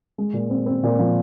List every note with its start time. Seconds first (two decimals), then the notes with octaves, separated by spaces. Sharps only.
0.18 G#3
0.33 A#2
0.50 C4
0.66 C4
0.83 A#2
0.99 F3